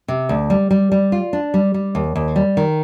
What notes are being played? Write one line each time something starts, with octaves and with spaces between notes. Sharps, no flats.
C3
D2
G3
G3
G3
F4
D4
G3
G3
D#2
D#2
G3
D#3